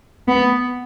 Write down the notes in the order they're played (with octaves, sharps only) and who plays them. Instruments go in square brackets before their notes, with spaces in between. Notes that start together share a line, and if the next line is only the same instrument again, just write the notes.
[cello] B3